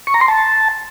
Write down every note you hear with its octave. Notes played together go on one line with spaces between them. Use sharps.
C#6
A#5
C6
A5